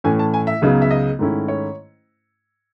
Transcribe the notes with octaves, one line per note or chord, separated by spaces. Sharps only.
A2 E3 A3 C#4 G#5
A5
G#5
E5
C#2 C#3 F#3 B3 D#4
E5
D#5
G#2 D#3 A3 C#4 E4
C#5